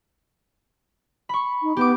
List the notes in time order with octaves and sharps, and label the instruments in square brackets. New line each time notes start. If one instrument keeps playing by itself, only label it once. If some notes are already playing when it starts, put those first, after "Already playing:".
[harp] B5 C#6
[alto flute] D#4
[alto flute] B3 [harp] G4 D6